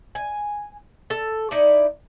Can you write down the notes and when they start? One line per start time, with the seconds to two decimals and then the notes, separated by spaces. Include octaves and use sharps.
0.15 G#5
1.10 A4
1.51 D#4 E4 D5